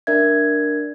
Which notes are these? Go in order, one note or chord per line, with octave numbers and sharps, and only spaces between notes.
D4 A#4 D5 E5 G#6